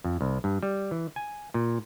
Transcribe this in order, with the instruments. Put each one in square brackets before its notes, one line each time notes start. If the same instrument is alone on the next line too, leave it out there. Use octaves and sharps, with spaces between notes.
[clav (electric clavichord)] F2
C2
G2
G3
E3
G#5
A#2